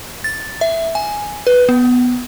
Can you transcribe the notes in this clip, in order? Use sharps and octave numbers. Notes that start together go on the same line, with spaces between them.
A6
E5
G#5
B4
B3